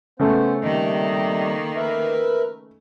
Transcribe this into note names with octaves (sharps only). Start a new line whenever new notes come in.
C#3 A3 B3 C#4 C5
C3 D#3 G3 A#3 D#5
A#4 B4 E5